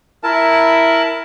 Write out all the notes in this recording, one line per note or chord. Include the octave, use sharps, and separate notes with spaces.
E4 A#4 A5